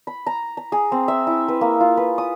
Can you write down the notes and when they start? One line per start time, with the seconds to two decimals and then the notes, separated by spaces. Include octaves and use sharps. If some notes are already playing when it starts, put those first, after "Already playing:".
0.07 B5
0.27 A#5
0.57 A#5
0.72 G#4
0.92 C4
1.08 E5
1.27 E4
1.48 B4
1.61 A#3
1.80 F4
1.97 B4
2.18 D#6